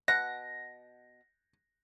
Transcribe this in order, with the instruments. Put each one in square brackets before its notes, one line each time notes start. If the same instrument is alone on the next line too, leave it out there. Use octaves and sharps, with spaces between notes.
[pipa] B2 F#5 [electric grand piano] A#6